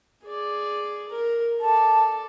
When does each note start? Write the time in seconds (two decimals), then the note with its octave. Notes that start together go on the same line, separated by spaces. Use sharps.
0.24 G#4 D5
1.09 A#4
1.61 A4 D5 A5